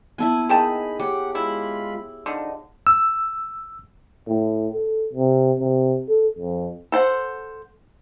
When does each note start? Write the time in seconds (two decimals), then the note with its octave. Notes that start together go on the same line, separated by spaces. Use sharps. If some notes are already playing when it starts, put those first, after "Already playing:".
0.18 B3 E4 A4 G#5
0.49 D#3 D#4 G#4 G5 A5 B5
1.00 G4 C#5 F#5
1.35 G#3 E4 F4 B5
2.26 D3 F3 D#4
2.87 E6
4.28 A2
4.73 A4
5.13 C3
5.60 C3
6.09 A4
6.38 F2
6.92 A4 C5 F#5